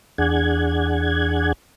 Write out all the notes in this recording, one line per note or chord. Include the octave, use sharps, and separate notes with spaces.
E2 D4 G#4 F#5 G#6